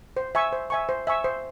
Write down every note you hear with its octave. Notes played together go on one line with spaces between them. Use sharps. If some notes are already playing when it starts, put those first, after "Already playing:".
C5
E5 G#5 C#6
C5
E5 G#5 C#6
C5
E5 G#5 C#6
C5